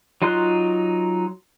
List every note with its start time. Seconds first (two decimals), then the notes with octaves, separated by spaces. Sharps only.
0.22 F#3 D#4 F4 C6 F#6